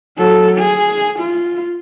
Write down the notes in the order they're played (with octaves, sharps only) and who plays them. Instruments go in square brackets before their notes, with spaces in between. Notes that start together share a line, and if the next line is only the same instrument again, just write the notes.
[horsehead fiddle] F#3 A4
G#4
F4